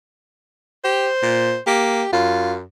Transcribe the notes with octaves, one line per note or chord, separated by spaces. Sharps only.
G4 C5
A#2
A#3 G4
F#2 F4